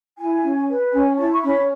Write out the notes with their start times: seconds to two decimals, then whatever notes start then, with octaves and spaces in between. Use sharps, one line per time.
0.18 E4 G#5
0.43 C#4
0.68 B4
0.93 C#4 G#5
1.17 E4 A5
1.32 C#6
1.42 C#4 B5